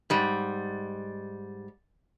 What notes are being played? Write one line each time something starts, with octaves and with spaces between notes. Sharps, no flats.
G#2 G3